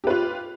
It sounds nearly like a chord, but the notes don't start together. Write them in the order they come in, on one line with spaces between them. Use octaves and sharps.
G4 B4 F4